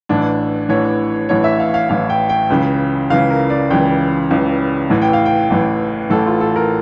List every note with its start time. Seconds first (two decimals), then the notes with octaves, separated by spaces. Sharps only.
0.09 A1 A2 E3 D4
0.69 A1 A2 E3 C#5
1.29 A1 A2 E3 C#5
1.44 E5
1.60 F5
1.74 F5
1.89 A1 A2 E3 F5
2.10 G5
2.29 G5
2.50 C#2 C#3 E3
3.10 C#2 C#3 E3 F5
3.30 A#4
3.50 D5
3.70 C#2 C#3 E3 G5
4.31 C#2 C#3 E3
4.90 A1 A2 E3
5.02 G5
5.13 F5
5.26 G5
5.50 A1 A2 E3
6.10 A1 A2 E3 A4
6.26 F4
6.40 A4
6.56 A#4